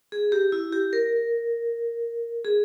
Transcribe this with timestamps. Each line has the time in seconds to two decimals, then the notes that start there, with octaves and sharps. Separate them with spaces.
0.12 G#4
0.32 G4
0.52 E4
0.72 G4
0.93 A#4
2.45 G#4